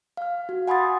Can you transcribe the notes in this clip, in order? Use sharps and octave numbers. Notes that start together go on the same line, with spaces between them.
F5 F6
F#4
F#5 G#5 B5 C6 D#6 A6